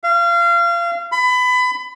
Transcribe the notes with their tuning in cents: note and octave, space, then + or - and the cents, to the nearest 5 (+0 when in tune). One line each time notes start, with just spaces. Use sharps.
F5 -30
B5 +25